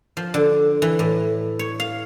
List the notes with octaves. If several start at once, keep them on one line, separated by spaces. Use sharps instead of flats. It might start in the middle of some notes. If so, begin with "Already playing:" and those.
F3
D3
E3
A2
C#5
F5